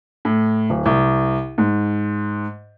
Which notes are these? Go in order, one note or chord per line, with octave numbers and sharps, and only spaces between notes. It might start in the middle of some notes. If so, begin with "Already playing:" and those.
A2
D1
C2
G#2